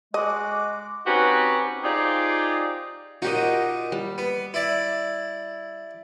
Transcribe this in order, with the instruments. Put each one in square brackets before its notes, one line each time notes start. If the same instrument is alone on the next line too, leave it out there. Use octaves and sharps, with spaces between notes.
[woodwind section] G#3 F#4 [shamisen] D#5 [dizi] D6
[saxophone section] C4 C#4 D#4 F#4 G4 B4
D#4 F4 G4 G#4 C5 D5
[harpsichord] A#2 D#4 [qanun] F#4 G4 D#5
[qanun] G3
[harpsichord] B3
E4 D5